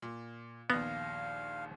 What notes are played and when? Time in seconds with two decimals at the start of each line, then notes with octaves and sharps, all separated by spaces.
0.02 A#2
0.70 A#1 D#2 B3 F5 A#6